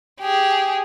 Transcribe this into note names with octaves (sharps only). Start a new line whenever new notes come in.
G4 G#4